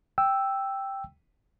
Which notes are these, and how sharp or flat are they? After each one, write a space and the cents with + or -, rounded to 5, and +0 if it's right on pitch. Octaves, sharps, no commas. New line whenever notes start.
G5 +0 E6 +0